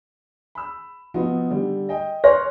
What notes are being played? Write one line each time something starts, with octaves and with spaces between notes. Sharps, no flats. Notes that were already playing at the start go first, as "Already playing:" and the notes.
B5 E6
F3 B3 D#4 F4 F#4
D3 G3
D#5 G5
C#5 C6 F6 F#6 A#6